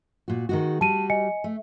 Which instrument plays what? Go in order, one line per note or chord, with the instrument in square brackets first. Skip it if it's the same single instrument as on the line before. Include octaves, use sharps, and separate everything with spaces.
[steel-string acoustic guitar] A#2 F#4
D#3 G#3 F#4
[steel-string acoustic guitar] G3 F#4 [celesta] A5 D#7
[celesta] D#5 G#5 C#7
[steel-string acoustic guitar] A3